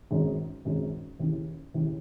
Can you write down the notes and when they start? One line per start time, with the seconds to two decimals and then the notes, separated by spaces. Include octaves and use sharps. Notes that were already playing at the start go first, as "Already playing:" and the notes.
0.10 G#1 F#2 D#3 G#3
0.65 G#1 F#2 D#3 G#3
1.19 D#2 C#3 E3
1.74 D#2 C#3 E3